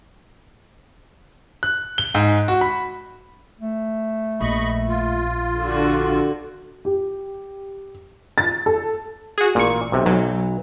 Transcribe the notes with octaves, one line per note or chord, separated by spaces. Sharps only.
F#6
G7
G#2
F#4
B5
A3
A#1 D#5 B5 C#6
F4
D3 F#4
G4
A6
A4
F#4 G#4
A1 A#2 C#6
B1 C3
B1 F#3